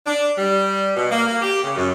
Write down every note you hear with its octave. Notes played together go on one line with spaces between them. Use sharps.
D4
G3
B2
A#3
A#3
G4
C#3
F#2